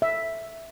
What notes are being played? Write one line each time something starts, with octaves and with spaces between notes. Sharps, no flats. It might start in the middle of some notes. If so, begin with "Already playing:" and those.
E5